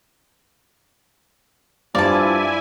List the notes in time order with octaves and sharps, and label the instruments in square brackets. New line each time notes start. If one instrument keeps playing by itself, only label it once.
[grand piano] G2 [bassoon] F3 [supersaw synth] E4 G#5 [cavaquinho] D5 A5